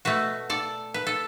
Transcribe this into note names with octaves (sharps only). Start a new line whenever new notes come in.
B2 A3 F#4 B4
A4 D5
B4
A4